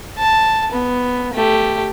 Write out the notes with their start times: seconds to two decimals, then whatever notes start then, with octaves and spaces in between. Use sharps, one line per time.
0.18 A5
0.72 B3
1.34 A3 G4